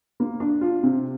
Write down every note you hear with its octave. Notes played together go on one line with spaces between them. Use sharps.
A#3
D4
F4
C3